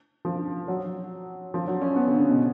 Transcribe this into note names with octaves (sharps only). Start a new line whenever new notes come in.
F3
F#3
F3
F#3
C#4
B3
D3
C#3
B2